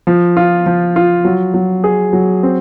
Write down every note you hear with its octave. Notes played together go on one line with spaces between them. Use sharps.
F3
F4
F3
F4
F#3
F#3
G#4
F#3
C4